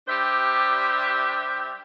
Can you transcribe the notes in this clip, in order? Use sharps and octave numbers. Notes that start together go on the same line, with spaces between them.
G3 D4 G4 C5 E5